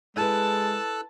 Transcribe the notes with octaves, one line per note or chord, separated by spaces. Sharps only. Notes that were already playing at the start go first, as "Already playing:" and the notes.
G#3 E4 A4 B4 A5 E6 F#6